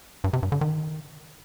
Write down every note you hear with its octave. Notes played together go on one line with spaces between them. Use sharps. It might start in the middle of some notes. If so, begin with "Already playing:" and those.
G2
C3
G2
D3
D#3